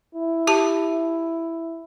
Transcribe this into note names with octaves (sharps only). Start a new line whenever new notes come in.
E4
G4 A5